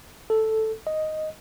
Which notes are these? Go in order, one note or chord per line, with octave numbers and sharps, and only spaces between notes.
A4
D#5